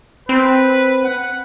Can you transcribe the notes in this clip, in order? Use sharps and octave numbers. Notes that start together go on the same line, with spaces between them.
C4 B4
F#5